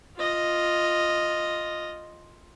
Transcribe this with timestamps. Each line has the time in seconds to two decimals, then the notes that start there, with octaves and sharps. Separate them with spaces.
0.17 F4 D#5